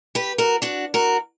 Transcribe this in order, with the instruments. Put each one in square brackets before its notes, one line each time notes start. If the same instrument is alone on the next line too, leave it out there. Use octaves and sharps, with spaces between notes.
[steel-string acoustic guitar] G4 B4
F#4 A#4
D4 F#4
F#4 A#4